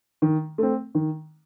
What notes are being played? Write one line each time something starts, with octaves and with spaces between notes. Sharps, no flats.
D#3
A3 C4
D#3